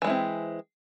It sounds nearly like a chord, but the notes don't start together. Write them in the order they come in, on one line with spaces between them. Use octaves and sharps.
E3 G#3 E4 C4